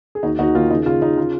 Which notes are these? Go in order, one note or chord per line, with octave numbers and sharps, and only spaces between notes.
G#4
D#2 D#4 F#4
D#2 D#4 F#4
D#2 F4
C#3 D#4
C#3 F4
C#3 D#4
C#3 F4